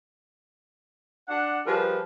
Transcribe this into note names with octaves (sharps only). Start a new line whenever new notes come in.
D4 F#5
F3 G3 G#4 A#4 B4